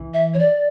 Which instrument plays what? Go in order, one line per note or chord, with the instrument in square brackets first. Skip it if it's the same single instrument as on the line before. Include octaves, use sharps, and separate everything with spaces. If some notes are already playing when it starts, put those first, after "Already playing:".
Already playing: [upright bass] E3
[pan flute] E5
C#5
D5